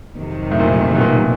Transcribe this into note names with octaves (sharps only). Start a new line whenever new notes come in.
F2 C3 D#3 F#3
A2
A#2
B2
A#2